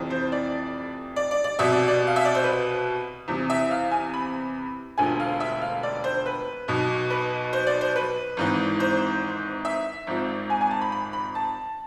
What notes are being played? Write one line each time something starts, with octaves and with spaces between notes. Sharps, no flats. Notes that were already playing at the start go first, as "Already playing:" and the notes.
Already playing: F1 F2 E3
C5
D5
D5
D5
D5
C2 B2 E5
D5
D5
F5
E5
D5
C5
B4
E2 C3 E3
E5
F5
G#5
B5
E1 D2 D3 F3 G#5
F5
E5
F5
D5
C5
B4
B1 B2
B4
C5
D5
C5
B4
G#1 G#2 E3
C5
E5
G#1 G#2 F3
G#5
G#5
A5
B5
B5
B5
A5